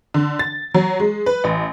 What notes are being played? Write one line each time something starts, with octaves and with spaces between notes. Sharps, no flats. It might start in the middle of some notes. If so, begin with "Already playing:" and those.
D3
A6
F#3
G#3
B4
A1